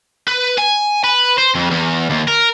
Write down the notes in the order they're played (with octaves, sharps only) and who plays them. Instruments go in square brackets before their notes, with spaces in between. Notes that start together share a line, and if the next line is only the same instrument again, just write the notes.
[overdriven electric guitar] B4
G#5
B4
C5
F2
E2
D#2
A#4